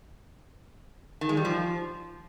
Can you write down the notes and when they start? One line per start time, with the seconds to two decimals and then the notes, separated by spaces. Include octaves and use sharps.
1.21 D#3
1.29 G#3
1.37 G3
1.45 F3